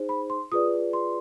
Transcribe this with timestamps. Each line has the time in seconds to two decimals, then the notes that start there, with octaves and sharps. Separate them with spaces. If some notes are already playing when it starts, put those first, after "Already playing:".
Already playing: D#4 G#4 C5
0.09 B5
0.30 C6
0.52 F4 G#4 B4 D5 D#6
0.93 C6